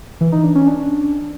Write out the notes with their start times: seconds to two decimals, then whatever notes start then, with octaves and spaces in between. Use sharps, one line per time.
0.21 E3
0.32 D#4
0.44 D4
0.55 C#4
0.67 D4